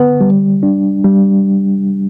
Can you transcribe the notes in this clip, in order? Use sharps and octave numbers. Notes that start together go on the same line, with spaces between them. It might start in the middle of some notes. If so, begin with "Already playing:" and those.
Already playing: D3 B3
G3
D4
G3